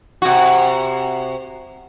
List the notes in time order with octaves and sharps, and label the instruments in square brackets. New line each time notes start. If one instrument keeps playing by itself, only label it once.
[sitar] C3 F#4